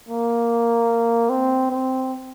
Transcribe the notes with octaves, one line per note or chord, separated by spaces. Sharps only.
A#3
C4
C4